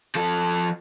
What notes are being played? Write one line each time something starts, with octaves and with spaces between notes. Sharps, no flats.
F3 A4